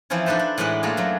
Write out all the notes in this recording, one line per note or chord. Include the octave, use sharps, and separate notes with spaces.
E3 F3 C4 C#4 E4
D4 D#4 A4 B4 C5
D4
A2 E3 G#3 B4 F#5
A3 A#3 F4 F#4 G#4
F#2 F#3